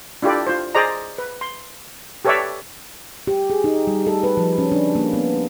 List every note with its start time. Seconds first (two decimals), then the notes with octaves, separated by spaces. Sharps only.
0.22 D4 E4 F4 G4 A4 D5
0.47 F4 C5
0.75 G#4 C5 D5 D#5 A#5
1.18 B4
1.41 C6
2.25 G4 A4 B4 C#5 D5 E5
3.27 G4
3.50 G#4
3.64 D#4
3.87 G3
4.07 A4
4.23 B4
4.37 F3
4.58 C#4
4.72 D4
4.95 A#3
5.13 B3